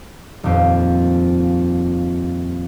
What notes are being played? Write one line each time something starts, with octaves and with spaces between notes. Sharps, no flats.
D#1 F2 C5